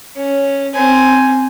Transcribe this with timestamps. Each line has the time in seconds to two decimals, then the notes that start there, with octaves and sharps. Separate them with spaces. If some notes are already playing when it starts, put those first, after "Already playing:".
0.16 C#4
0.74 C4 G#5